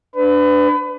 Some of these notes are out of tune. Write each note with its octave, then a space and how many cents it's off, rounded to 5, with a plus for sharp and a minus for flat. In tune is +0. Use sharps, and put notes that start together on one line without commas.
D4 +0 B4 +30